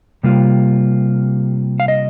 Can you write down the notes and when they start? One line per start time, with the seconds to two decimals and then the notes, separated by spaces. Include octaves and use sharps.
0.23 C3 G3 A#3 F4
1.80 F5
1.88 D#5